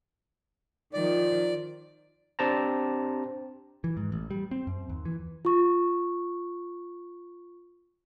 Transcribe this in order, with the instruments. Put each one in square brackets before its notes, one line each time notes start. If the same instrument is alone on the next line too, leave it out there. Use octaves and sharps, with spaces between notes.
[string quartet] D#3 F3 [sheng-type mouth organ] D5
[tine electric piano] C4 D4 G4 C5 A5 A#5
[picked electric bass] E3
G#2
A1
G3
C4
F#2
D#2
E3
[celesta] F4 C#6